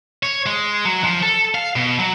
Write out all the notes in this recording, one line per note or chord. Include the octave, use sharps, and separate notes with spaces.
C#5
G#3
F#3
F3
A4
F5
B2
F#3